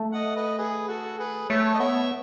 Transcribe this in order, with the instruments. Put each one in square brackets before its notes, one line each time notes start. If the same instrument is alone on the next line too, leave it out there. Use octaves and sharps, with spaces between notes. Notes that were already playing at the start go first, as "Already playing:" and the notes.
Already playing: [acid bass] A3
[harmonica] D#5 F#5
B4 D#5
G#4 B4
F#4 A4
G#4 B4
[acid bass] A3 [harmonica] A4 C#5
[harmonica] D#5
[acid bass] B3 [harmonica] C#5 E5